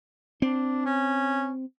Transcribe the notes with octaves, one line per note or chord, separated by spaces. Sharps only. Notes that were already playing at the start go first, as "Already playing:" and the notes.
C4 D4
C#4